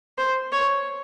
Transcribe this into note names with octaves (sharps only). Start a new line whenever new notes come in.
C5
C#5